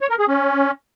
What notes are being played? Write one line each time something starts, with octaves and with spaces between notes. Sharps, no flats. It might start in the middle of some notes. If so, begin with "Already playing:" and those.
C#5
A#4
G#4
C#4